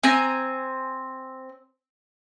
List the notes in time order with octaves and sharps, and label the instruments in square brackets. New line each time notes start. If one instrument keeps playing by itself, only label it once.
[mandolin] C4 G#5 A#5